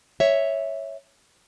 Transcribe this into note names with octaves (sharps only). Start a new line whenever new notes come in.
C#5 E5